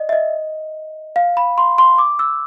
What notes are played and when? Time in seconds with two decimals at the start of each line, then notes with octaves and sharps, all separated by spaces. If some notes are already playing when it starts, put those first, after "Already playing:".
Already playing: D5 D#5
0.09 E5
0.13 D#5
1.16 F5
1.37 B5
1.58 C6
1.78 C6
1.98 D6
2.19 E6